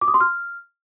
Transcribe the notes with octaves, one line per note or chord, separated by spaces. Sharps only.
D6
D#6
C6
F6